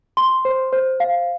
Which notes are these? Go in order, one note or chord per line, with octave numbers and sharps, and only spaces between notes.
C6
C5
C5
F5